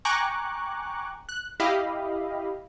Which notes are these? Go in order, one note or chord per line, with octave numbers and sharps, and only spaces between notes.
G5 G#5 A#5 C#6 D6 F#6
F#6
E4 G4 D#5 F5 B5